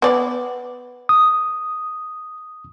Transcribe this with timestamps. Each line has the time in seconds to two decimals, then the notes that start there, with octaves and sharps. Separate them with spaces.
0.02 B3 D5
1.09 D#6